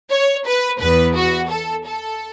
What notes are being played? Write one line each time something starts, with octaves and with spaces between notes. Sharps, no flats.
C#5
B4
E2 E3 B3 B4
F#4
A4
A4